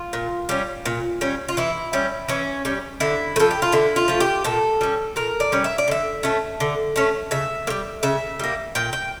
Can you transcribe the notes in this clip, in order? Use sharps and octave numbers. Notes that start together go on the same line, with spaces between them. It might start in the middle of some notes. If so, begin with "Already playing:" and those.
Already playing: F4
A#2
G3 C#4
A#2
G3 C#4
F4
E3 E4
G3 C#4
E3 C#4
G3 C#4
D3 E4
A3
F3 A4
G4
F4
D3 E4
F4
F3 A3
G4
A#2 A4
G3 C#4
A#2 A#4
D5
G3 C#4
E5
D5
D3 E5
A3 C#4
D3
A3 C#4
C#3 E5
A#3
G3
C#3 E5
G3 A#3
A#2 G5
G5